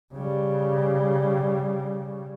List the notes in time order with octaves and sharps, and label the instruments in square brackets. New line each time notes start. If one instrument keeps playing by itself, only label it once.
[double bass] C#3 G3